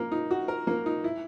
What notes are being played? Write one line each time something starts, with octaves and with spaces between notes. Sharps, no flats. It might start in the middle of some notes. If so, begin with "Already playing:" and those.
Already playing: A#3 A#4
D#4
F#4
A#4
A#3
D#4
E4